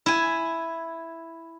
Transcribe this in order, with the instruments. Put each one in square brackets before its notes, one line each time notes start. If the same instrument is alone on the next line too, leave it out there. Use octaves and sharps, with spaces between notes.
[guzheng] E4 G#5